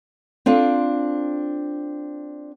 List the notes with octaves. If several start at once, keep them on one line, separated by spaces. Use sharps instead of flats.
C4 D4 F4 A4